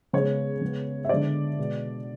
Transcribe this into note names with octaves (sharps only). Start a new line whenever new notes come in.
C#3 G#3 B3 C#5
C#3 G#3 B3
E5
D3 G#3 B3 D5
B2 G#3 B3